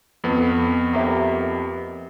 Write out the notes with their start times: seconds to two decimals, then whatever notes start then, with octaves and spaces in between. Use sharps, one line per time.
0.24 F2 B3
0.93 A#3 G4 E5